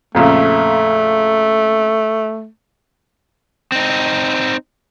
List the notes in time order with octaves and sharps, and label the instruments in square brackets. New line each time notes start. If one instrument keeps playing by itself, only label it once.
[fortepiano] F2 A#2 C#3 [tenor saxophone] A3
[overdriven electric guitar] C4 D#4